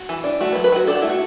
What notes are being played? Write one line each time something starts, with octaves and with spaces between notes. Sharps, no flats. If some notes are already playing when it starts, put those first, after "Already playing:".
Already playing: F#4
E3
D4
A3 F#4
B4
F#3
B4
F#3 F#4
D4 A4
F#4
A3 E4
F#4